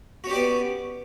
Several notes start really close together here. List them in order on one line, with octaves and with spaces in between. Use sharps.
F#4 C#4 G4 D5 B3